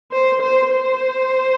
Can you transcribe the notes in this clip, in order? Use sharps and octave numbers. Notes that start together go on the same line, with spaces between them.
C5
C5
C5